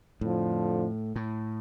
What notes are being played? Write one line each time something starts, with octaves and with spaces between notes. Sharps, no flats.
F2 A2 D3 F3
A2